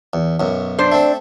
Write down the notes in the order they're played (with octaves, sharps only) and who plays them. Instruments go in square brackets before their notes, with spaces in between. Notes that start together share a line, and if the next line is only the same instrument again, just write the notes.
[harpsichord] E2
B1 F#2
[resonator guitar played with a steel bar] D4 C5
[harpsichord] A3 C4